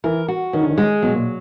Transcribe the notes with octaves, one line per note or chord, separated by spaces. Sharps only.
E3 A#4
F#4
D#3 C#4
D3
D#3
G#3
B2 F#3
A#2